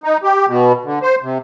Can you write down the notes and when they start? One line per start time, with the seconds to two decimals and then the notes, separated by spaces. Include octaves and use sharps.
0.04 D#4
0.23 G4
0.48 B2
0.85 D3
1.02 C5
1.23 C3